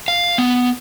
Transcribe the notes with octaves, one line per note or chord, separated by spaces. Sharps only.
F5
B3